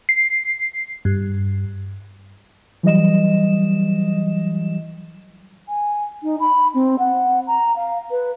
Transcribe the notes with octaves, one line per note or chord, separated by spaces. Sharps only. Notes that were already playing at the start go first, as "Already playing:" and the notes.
C7
G2
E3 F#3 G3 D#5 E7
G#5
D#4
B5
C4
F#5
A#5
F5
B4